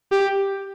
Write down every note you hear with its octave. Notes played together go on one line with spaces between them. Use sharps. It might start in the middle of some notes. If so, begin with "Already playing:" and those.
G4